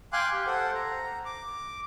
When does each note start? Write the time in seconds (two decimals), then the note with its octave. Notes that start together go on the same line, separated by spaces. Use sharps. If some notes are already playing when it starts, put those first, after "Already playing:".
0.13 F5 G5 G#5 C6 D6 F#6
0.33 G4
0.47 A4 C5 F#5
0.75 A#5
1.25 D6